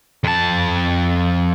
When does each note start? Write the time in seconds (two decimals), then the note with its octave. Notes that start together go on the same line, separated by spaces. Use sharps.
0.24 F2 A5